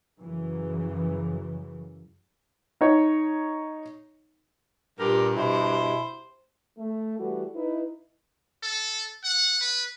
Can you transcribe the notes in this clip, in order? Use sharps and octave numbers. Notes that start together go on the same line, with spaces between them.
F#2 C#3 E3
D#4 C#5
G2 A#2 G4 A#4
B2 E4 C5
A3
E3 G3 A3 F#4
D#4 E4 B4
A4
F#5
B4